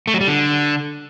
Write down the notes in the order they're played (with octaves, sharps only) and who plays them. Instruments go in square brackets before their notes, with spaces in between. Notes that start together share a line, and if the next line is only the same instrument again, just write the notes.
[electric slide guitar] A3
F#3
G3
D3